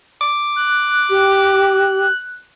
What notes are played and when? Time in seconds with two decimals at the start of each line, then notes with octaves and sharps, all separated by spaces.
0.21 D6
0.56 F#6
1.09 G4